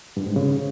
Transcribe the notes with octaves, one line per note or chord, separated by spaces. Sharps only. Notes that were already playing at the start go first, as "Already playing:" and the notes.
G2
G#2
C#3